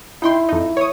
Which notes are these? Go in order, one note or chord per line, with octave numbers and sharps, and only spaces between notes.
D#4 E4 G5 C6
F2 D#4
C#5 D#6